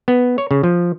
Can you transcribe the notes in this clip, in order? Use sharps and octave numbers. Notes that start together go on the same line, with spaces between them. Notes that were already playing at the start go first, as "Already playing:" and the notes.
B3
C#5
C#3
F3